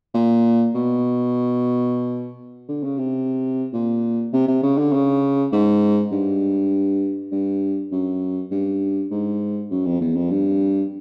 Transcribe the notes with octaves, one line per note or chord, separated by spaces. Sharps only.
A#2
B2
D3
C#3
C3
A#2
C3
C3
C#3
D3
C#3
G#2
G2
G2
F#2
G2
G#2
F#2
F2
E2
F2
G2